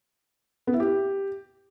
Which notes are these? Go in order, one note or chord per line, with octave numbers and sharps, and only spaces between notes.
B3
E4
G4